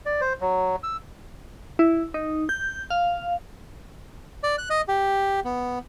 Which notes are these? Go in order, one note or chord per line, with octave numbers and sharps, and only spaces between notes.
D5
C5
F#3
E6
E4
D#4
G6
F5
D5
F#6
D#5
G4
B3